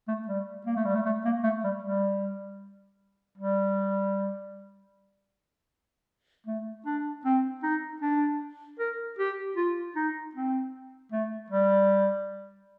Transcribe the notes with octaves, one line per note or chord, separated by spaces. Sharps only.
A3
G3
A#3
A3
G3
A3
A3
A#3
A3
G3
G3
G3
A3
D4
C4
D#4
D4
A#4
G4
F4
D#4
C4
A3
G3